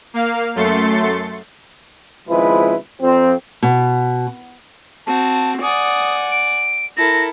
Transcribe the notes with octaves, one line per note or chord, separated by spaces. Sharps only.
A#3 F5
F#2 A3 C6 A6 C#7
G#1 C#2 F3 G#3 E4 B4
F2 C4
B2
C4 F#4 A5
D5 F#5 G#5 D#6
D7
E4 A4 A#4 A#6